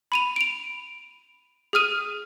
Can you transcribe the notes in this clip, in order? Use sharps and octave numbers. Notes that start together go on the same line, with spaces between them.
B5 D#7 F7
D7 F7
G#4 D#6 F6 D#7